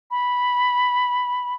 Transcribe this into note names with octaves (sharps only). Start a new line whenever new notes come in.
B5